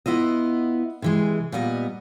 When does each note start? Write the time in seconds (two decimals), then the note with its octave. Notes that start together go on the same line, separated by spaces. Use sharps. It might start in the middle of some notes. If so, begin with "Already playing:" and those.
0.06 B3 E4 F4 D#5
1.02 C3 E3 G#3
1.52 A#2 G3 B3 D#5